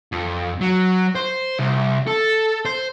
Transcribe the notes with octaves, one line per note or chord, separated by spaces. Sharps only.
F2
F#3
C5
C2
A4
C5